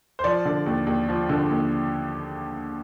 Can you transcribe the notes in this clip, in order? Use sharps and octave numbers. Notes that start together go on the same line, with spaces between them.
C5
F3 D5
D3
D#2
D#2
F3
D3
D#2